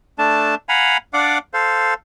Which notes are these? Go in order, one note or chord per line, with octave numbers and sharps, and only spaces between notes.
A3 D4 A5
F5 F#5 G#5 A#5 B5
D4 D5 F5 F#5 D6
A4 C5 F5